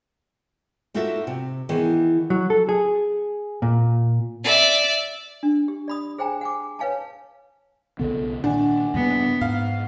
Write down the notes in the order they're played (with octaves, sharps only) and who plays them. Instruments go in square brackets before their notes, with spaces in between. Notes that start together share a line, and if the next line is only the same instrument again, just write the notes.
[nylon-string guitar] A#3 D#4 F4 F#4 A4 E5
C3
D#3 E3 B3 D#4 G#4
[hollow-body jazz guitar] F#3
A4
G#4
A#2
[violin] D5 E5
[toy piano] D4
G4
D5 B5 D#6
G#4 C5 G5 G#5 A#5
F#5 G#5 D6
B4 C#5 F5 G#5 A5
[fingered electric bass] B1 C#3 B3 [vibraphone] A4
[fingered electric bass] A#2 D#3 [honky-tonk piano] D4 [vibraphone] F#5 G#5
[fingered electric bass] G2 C#3 A#3 [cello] B3
[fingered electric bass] G#2 [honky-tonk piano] F5 [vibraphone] F#5